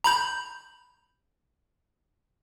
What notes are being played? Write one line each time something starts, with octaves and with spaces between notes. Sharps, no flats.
A#5 B5 G6